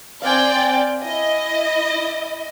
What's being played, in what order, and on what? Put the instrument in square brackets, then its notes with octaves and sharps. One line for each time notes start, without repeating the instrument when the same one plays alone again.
[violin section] C4 D5 G5 [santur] F5 G#5
[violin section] E4 D#5